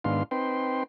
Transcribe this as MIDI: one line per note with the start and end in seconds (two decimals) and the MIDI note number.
0.04 0.23 44
0.04 0.23 51
0.04 0.23 59
0.04 0.23 62
0.04 0.23 77
0.04 0.23 84
0.31 0.83 60
0.31 0.83 63
0.31 0.83 71
0.31 0.83 79
0.31 0.83 84